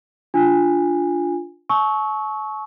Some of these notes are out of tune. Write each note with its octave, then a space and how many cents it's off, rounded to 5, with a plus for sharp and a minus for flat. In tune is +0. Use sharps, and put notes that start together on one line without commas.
D4 +0 F4 +0 G#5 -20
A5 -45 C#6 +0 E6 -30